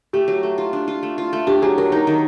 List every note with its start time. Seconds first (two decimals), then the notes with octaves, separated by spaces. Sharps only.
0.13 A3 G4
0.28 F#3
0.43 A3
0.58 F4
0.73 D4
0.88 F4
1.03 A3
1.18 F4
1.33 A3
1.47 D4 G4
1.62 F#3 G#4
1.77 F#3 A#4
1.92 D#4 A#4
2.07 D#3